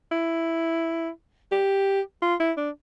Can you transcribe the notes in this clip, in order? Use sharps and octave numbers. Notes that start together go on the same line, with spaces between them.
E4
G4
F4
E4
D4